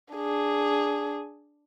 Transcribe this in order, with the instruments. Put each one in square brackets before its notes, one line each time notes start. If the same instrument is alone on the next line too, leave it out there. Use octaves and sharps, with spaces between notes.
[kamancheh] D4 G#4